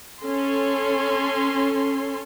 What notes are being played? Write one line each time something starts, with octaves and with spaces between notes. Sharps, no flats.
C#4 A4 C6